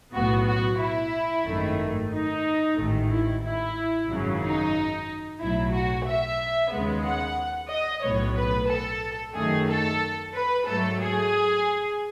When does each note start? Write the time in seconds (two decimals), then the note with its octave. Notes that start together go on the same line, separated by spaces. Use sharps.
0.13 B1 A2 F#3 B3 F#4
0.47 F#4
0.80 E4
1.45 G#1 F#2 D#3 A3
2.11 D#4
2.77 A1 G#2 D#3 A3
3.09 E4
3.42 E4
4.08 G#1 F#2 C#3 F#3
4.42 D#4
5.40 B1 A2 F#3 E4
5.73 F#4
6.06 E5
6.71 D#2 C#3 G#3 B3
7.04 F#5
7.70 D#5
8.03 B1 A2 F#3 B3 C#5
8.36 B4
8.70 A4
9.35 F#2 D#3 A3 G#4
9.68 A4
10.34 B4
10.67 G#2 F#3 A3 A4
11.00 G#4